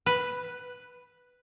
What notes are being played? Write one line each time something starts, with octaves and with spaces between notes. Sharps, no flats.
B4